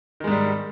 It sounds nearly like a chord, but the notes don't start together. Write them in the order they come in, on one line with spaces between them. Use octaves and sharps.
D#3 G#3 G#2 G3